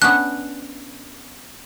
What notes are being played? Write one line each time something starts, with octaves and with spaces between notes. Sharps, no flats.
B3 C#4 D4 F#6